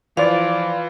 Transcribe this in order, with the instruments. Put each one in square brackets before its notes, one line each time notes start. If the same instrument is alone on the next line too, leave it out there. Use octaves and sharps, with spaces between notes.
[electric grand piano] E3 F4 [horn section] F3 D5 [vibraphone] F5